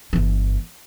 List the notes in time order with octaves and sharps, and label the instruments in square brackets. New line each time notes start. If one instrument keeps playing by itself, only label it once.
[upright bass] G1 E3